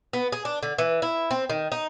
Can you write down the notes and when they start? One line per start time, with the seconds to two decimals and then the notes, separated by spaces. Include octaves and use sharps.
0.13 B3
0.32 G#4
0.45 D4
0.63 D3
0.78 E3
1.02 E4
1.31 C4
1.49 D#3
1.72 D#4